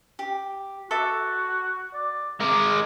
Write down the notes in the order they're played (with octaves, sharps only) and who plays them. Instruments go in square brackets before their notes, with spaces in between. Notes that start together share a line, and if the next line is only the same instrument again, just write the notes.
[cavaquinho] G4
[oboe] F#4 [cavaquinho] A4 E5 D6
[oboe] D5
[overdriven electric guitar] G#3 A#4 [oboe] D6